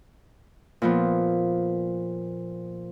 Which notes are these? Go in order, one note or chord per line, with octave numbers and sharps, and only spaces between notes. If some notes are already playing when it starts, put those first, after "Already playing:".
A#2 F3 B3